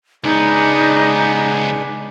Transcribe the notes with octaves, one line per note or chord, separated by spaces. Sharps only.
C#2 G#3 B3 D4 D#4